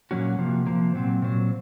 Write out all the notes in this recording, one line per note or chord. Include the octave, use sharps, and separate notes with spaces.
A#2 F#3 A#3 C#4 F#4
C3 F3 A#3
C3 F3 A#3
A#2 F#3 C4
A#2 F#3 C4